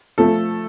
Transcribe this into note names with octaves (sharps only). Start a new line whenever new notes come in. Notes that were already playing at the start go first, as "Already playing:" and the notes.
F3 A3 A4